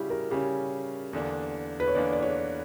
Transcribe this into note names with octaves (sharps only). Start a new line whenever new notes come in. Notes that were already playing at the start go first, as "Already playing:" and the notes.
Already playing: C#3 G3 C#4 E4 F#4 G4
A#4
C#3 G3 C#4 G4
E2 D3 A#3 D4
B4
C#5
E2 D3 A#3 D4 D5
D5
C#5